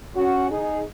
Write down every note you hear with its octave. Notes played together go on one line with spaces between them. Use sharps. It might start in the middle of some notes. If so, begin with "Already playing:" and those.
C#4 F#4
D#4 G#4